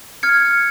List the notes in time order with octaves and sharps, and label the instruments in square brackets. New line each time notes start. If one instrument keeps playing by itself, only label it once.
[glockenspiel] F6 G#6 C#7